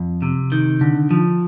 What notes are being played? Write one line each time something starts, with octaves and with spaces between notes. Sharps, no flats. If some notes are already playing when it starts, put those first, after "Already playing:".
Already playing: F2
C3
D#3
D3
F3